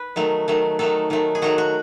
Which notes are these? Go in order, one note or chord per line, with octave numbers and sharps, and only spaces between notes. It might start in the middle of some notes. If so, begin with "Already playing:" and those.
Already playing: B4
D#3 F#3 A3
D#3 F#3 A3
D#3 F#3 A3 A4
D#3 F#3 A3
G#4
D#3 F#3 A3 F#4
F#4